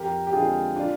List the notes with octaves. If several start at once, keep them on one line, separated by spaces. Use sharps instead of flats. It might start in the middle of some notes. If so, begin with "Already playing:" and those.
Already playing: F2 G4 A#4
G4
D3 G#3 C4 F4 G#4
D4 F4